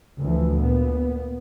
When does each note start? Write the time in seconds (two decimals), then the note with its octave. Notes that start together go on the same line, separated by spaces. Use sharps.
0.19 D2 E3 F3
0.57 A#2 B3